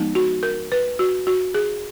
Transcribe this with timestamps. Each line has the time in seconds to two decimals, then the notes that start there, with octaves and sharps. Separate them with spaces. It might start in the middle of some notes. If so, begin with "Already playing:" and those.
Already playing: F3 G#3 B3 D#4
0.15 F#4
0.43 A#4
0.72 B4
0.99 F#4
1.27 F#4
1.54 G#4